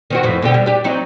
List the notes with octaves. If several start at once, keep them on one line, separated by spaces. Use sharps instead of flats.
D#3 C4 F#4
F2 A2 E3
B2 D3 G4
G3
D4 G4
F#3 C4 D#4